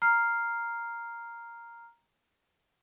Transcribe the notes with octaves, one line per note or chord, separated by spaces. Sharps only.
A#5 F6 C7